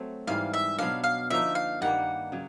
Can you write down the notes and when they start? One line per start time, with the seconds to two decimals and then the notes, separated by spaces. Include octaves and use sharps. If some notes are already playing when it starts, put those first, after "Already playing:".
Already playing: F#3 A3 C4
0.27 G#2 E3 G3 F5
0.53 E5
0.78 B2 F#3 B3 D4 F5
1.04 F5
1.30 D3 F3 A#3 D#4 E5
1.55 F5
1.81 G2 D#3 G3 A#3 F#5
2.32 C#3 F#3